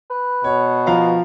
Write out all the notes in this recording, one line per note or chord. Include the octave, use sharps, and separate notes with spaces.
B4
B2 C#5
F3 F5 A#5